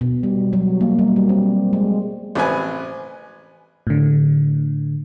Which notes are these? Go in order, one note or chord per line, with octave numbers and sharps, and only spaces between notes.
B2
G3
F#3
A#3
G3
G3
C4
G#3
A1 C4 B4 G#5
A2 D3